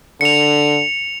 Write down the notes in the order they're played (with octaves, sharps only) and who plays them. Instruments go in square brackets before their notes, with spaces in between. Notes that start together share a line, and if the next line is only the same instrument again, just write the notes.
[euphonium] D3 [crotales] C#7 F7